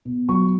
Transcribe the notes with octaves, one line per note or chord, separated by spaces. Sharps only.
B2
F#3 C#6